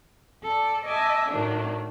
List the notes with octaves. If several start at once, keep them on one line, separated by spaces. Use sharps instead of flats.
A4 D5
D#5 E5 G#5 A5 D6
A2 D#3 F#3 A3 D4